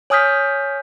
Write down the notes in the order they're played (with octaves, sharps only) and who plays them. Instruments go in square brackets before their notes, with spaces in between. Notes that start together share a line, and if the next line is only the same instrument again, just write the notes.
[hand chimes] C#5 G#5 D#6 F6 G6 B6